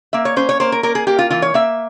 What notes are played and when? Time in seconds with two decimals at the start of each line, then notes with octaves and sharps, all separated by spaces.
0.13 A#3 E5
0.25 C#5
0.36 C#4 C5
0.49 C#5
0.60 A#3 C5
0.72 A#4
0.83 A#3 A#4
0.95 G#4
1.07 A#3 G4
1.19 F4
1.30 E3 F4
1.42 C#5
1.54 A#3 E5